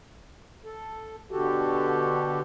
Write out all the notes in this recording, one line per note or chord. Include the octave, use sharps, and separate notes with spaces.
A4
B2 D3 F#4 G4 A4